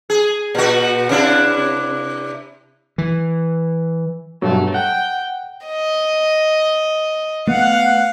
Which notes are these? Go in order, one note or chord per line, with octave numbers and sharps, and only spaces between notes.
G#4
A#2 F#4
C3 D4 E4
E3
G2 B2 F#3 A3
F#5 G5
D#5
A3 B3 F5 F#5